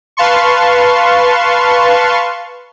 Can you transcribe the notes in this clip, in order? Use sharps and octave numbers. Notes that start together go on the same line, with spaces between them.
B4 F5 A5 C6 C#6